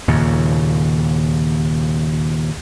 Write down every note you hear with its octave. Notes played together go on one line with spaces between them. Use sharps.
D#2 A#2 C#3